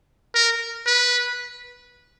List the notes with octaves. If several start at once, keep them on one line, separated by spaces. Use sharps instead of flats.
A#4
B4